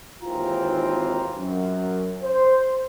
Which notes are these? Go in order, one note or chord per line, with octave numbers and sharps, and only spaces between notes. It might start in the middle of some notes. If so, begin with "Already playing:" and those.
G#1 D#2 E3 C4 F4 A#5
F#2
C5